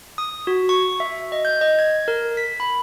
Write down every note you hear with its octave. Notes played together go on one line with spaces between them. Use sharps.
D#6
F#4
C#6
E5
D#5
G6
D#5
G#6
A#4
B6
B5